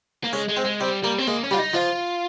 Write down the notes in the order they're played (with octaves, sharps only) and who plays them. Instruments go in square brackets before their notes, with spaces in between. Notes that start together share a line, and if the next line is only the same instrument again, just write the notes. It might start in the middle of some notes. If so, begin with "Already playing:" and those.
[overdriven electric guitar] A#3
[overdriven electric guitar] G#3 [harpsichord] C#4
[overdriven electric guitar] G#3
[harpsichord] C4
[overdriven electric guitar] G#3
[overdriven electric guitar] G3 [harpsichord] C4
[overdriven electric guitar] G3 [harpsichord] A#3
[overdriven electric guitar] C4
[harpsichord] G#3 [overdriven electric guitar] A#3
[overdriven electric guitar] C#4
[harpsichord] G3 [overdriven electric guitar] F4
[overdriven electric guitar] D#4
[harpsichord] F3 [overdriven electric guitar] F4